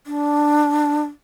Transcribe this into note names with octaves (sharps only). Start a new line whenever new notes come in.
D4